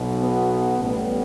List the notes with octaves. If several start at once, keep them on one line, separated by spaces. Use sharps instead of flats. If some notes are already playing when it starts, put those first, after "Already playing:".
Already playing: B1 B2
B3
A1 A2 G3 B3